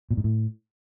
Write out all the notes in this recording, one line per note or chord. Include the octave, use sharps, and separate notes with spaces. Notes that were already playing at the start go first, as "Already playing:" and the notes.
A#2
G#2
A2